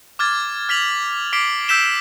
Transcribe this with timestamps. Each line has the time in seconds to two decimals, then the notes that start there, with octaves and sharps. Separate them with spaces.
0.19 D6 F6 G#6 A6
0.69 F6 B6 F7 F#7
1.33 D6 B6 C7 D7 G7
1.68 E6 G6 B6 E7 G7